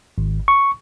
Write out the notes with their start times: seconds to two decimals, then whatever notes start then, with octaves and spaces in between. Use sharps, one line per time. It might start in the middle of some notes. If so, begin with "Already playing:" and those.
0.18 G#1
0.48 C#6